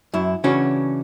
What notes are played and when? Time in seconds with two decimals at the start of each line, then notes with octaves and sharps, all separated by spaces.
0.14 F#2 E4
0.44 C#3 E3 C#4 D4 F#4